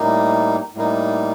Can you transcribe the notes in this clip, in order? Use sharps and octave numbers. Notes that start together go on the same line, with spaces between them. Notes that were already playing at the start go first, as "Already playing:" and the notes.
Already playing: A2 G3 A#3 D#4
A2 G3 A#3 D#4